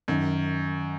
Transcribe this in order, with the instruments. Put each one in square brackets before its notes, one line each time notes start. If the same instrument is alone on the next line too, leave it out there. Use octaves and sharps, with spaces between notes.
[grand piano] F#2 [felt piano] D#3